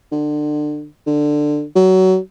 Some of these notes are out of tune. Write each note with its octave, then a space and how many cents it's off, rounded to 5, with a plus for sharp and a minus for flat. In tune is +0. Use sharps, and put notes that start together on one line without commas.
D3 +30
D3 +15
F#3 +20